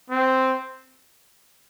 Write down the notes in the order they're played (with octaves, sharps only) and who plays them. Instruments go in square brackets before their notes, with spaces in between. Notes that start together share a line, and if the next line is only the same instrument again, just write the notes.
[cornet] C4